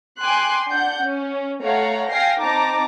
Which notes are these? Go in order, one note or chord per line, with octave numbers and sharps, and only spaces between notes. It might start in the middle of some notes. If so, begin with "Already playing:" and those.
G5 G#5 C6 D6 F#6
D4 F#5 G6
C#4
A3 C#5 F5 F#5 A#5
F5 G5 G#5 A#6 C7
C4 D#4 A5 A#5 D6